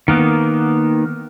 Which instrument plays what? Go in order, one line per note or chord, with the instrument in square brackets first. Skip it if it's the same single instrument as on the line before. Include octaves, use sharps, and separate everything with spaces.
[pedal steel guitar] D#3 A#3 B3